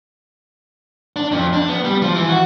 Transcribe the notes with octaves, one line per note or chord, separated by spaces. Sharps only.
D4
F2
D4
B3
G3
F3
E3
F#4